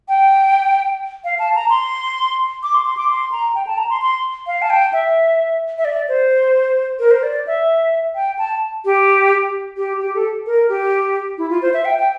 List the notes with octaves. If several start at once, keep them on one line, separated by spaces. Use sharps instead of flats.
G5
F5
A5
A#5
C6
D6
C6
C6
D6
C6
A#5
G5
A5
A#5
C6
C6
F5
A5
G5
E5
E5
D5
C5
A#4
C5
D5
E5
G5
A5
G4
G4
G4
A4
A#4
G4
E4
F4
C5
E5
G5
G5